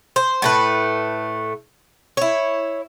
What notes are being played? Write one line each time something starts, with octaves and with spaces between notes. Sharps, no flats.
C5
A2 A3 B4
E4 C#5